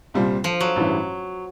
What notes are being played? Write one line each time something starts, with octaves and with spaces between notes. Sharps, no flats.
C2 A#2 G3 C4 F4
F3
F#3
A1 G2 E3